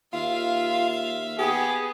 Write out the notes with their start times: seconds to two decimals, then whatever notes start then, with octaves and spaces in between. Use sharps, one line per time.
0.13 D#2 F4 E5 F5
1.39 B3 G4 G#4